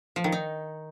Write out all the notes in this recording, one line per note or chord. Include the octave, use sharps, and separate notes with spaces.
F3
D#3
D#4